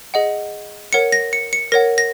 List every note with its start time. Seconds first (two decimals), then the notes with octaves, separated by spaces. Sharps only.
0.14 G#4 D#5 F#5
0.93 A#4 C#5 F#5 C#7
1.12 A#6
1.33 C#7
1.53 C#7
1.72 A#4 C#5 F#5 A#6
1.98 A#6